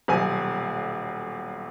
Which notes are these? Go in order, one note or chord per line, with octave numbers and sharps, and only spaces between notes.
D#1 B1 G#5